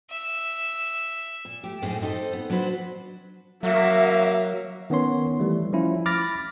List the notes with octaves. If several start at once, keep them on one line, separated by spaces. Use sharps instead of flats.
E5
A#2
A3 G4
F#2 A2 A3 C4 D#4 G#4
C4 D#4 F#4 A4 C5
B3
F#3 D4 F#4 B4 C5
F#3 A#3 F#4 E5
D#3 B3 C#4 C#5 C6
E3 G3 A3
F3 C#4 E4 F4
B5 D6 F6 A6 A#6